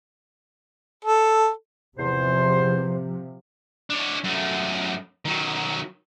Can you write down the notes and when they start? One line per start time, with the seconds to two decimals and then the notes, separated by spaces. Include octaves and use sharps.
1.04 A4
1.98 E2 C3 F3 C5
3.90 D4 C#5
4.24 F#2 A3
5.26 D#3 F#3